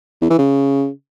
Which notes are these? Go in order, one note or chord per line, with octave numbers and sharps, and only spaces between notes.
E2
E3
C#3